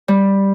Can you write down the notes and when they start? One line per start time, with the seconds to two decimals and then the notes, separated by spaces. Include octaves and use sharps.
0.08 G3